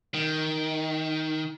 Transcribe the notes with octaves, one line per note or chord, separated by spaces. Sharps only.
D#3